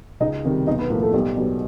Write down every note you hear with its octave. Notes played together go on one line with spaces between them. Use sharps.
C#2 D#4 D#5
C3 D#3 G3
B1 D#4 D#5
B3 B4
A2 F3 A#3 A#4
A3 A4
B1 G3 G4
B2 F#3